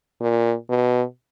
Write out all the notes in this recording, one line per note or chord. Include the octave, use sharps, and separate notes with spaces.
A#2
B2